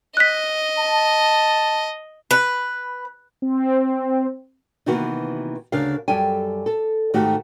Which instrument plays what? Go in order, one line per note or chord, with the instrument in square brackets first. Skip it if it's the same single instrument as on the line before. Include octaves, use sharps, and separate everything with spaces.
[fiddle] D#5 [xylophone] F#6 B6
[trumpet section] A5
[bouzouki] B4
[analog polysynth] C4
[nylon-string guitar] C3 D#3 E3 A#3 B3 F#4
D2 C#3 D4 A#4 F5
F#2 G3 G4 A4 G5 G#5
A4
G#2 D#3 A3 F#4 G4